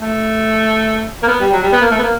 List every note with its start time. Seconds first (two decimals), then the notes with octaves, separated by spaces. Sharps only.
0.01 A3
1.23 A#3
1.28 B3
1.41 G3
1.53 F#3
1.63 G3
1.72 B3
1.82 A#3
1.91 A3
1.99 B3
2.03 A#3